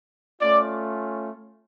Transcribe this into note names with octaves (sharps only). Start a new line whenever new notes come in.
A3 C#4 F4 D5